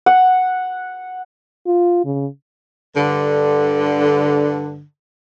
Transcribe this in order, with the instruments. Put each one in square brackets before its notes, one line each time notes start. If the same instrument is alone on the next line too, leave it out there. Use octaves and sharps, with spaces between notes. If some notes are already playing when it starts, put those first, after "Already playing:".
[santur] F#5
[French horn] F4
C#3
[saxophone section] G2 D3